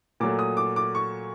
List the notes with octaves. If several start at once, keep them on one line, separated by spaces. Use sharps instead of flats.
A#2 F#3 A3 D6
D#6
D6
D6
C#6